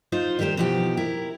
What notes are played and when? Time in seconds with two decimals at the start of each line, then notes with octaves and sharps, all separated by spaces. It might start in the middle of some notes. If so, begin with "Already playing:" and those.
0.12 D#4 F4 C5
0.39 D#3 G3 G4 A#4 C5
0.57 B2 E3 F3 D#4 G4
0.97 E4 A#4